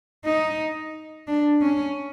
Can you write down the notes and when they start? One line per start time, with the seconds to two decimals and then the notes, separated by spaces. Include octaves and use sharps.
0.25 D#4
1.28 D4
1.62 C#4